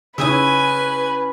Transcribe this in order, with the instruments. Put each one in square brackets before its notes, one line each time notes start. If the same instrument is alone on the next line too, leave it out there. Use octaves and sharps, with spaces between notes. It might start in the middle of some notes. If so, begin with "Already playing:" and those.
[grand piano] C#3 C#4 [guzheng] E4 G#4 E5 [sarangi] B4 [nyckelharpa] G#5